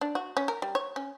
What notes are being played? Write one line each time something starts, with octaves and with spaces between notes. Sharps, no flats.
D4
F#4
C#4
A#4
G3
C#5
C#4